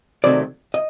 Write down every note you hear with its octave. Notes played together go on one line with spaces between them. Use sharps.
C3 D#3 F#3 A3 C4 D5
D#5